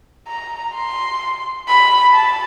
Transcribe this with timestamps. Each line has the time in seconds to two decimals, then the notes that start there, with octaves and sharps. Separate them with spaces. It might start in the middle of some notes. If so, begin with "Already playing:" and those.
0.28 A#5
0.75 C6
1.68 B5
2.13 A5